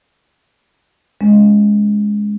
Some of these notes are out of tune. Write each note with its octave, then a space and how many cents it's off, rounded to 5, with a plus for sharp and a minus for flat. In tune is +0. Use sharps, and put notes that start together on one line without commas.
G#3 +0 C#4 +15